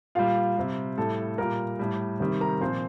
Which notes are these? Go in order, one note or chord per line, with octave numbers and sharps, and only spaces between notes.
A#2 G3 F4 F5
C3 G3
A2 G3 A4 A5
A#2 G3 A#4 A#5
A2 G3
C3 D#3 G3
A#4 A#5
A#2 F3 C4 C5